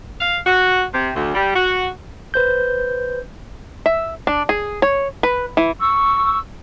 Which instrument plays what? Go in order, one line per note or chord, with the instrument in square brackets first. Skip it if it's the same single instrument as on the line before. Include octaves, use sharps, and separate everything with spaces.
[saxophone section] F5
F#4
C3
D2
G3
F#4
[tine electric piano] B4 C5 G6
[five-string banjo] E5
D4
G#4
C#5
B4
E3
[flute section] C#6 E6